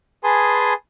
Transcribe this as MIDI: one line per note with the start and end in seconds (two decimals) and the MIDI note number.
0.24 0.73 68
0.24 0.73 71
0.24 0.73 80
0.24 0.73 81
0.24 0.73 84
0.24 0.73 87